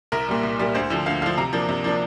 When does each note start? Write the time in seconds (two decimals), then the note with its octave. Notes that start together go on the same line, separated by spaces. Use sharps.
0.12 C2 A#4
0.28 A#2 G3
0.43 C2
0.59 A#2 G3
0.75 D2 C5
0.90 D3 F3
1.06 D2 F5
1.22 D3 F5
1.26 F3
1.38 C3 A#5
1.53 F3 A#3 D4
1.69 C3
1.84 F3 A#3 D4